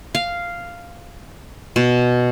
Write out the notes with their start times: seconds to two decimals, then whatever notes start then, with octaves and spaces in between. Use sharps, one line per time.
0.15 F5
1.76 B2